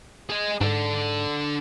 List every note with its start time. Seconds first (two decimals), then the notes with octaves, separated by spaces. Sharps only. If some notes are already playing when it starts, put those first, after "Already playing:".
0.30 G#4 D#5
0.61 G#2 D4 A4